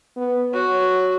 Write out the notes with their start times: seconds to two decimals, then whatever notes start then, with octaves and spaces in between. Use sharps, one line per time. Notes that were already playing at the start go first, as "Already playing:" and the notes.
0.17 B3
0.54 F#4 C#5